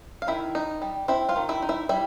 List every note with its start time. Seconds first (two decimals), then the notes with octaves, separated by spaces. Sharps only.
0.22 F5
0.27 D#3 E4 E5
0.55 D#4
0.82 G3
1.08 C4 E4 E5
1.29 F4 F5
1.36 D#3
1.49 E4 E5
1.62 D#4
1.69 E4 E5
1.89 G3 E4 E5